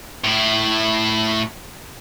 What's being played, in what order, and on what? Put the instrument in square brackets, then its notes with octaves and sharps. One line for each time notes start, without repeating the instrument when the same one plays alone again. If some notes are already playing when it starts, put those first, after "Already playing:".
[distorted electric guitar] A2 E4